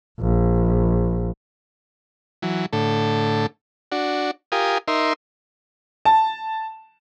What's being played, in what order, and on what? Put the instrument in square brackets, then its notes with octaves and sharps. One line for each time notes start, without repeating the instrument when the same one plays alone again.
[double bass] A#1
[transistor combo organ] E3 F#3
A2 D3 A4
D4 F#4
F4 G4 A#4 G#5 D#6
D#4 A#4 E5 C6
[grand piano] A5